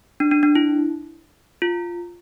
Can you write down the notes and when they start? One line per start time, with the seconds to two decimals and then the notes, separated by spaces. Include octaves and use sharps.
0.20 D4
0.31 D4
0.43 D4
0.55 E4
1.62 F4